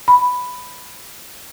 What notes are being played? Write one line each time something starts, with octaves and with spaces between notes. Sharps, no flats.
B5